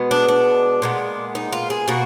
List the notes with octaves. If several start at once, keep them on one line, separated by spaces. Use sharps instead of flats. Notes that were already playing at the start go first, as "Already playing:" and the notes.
Already playing: B2 G#3 B3
D4
D4
A#2 G#3 B3
D#4
F4
G#4
B2 A#3 F#4